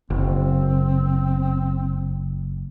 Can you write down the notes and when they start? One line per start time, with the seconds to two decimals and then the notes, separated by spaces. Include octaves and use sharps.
0.10 F#1 C4